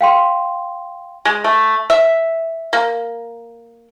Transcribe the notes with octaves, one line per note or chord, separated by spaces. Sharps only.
F5 G5 C6
G#3
A3
E5
A#3